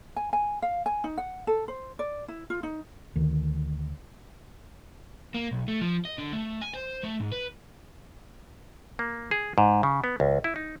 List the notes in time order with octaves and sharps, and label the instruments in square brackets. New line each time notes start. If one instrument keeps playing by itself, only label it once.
[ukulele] G#5
G#5
F5
G#5
D#4
F#5
A4
C5
D5
E4
F4
D#4
[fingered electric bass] D2 D#3
[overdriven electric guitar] A#3
B1
A3
F3
D#5
D3
A3
G#5
C5
A3
G#2
B4
[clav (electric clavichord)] A#3
G#4
G#2
C#3
B3
C#2
E4
D#4